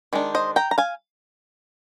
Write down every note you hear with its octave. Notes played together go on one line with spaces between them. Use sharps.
D#3 G#3 D4
C5 D#5
G5 A#5
A#5
F5 G#5